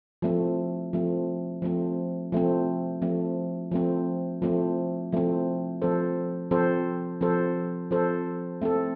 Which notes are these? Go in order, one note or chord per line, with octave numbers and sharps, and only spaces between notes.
F3 A3 C4
F3 A3 C4
F3 A3 C4
F3 A3 C4
F3 A3 C4
F3 A3 C4
F3 A3 C4
F3 A3 C4
F3 C4 A4 C5
F3 C4 A4 C5
F3 C4 A4 C5
F3 C4 A4 C5
A3 C4 A4